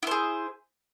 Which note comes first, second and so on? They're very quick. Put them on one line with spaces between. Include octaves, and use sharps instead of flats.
E4 C5 G#4